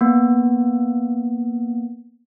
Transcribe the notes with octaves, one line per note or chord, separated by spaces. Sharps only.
A#3 B3